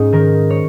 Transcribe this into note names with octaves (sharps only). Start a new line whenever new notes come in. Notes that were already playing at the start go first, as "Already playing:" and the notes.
Already playing: G#2 C#4 D#4
D#3 A#4
C#5